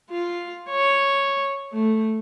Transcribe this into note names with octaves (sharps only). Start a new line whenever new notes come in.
F4
C#5
A3